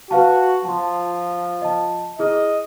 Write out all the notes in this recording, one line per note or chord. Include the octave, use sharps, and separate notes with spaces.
F#4 B4 F5 A5
F3 A5 C6
D#5 A5
E4 G#4 D#5 F6